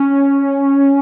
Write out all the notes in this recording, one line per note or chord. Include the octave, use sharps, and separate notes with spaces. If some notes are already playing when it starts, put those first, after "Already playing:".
Already playing: C#4